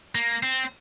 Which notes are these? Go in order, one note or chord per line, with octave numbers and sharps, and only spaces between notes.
A#3
C4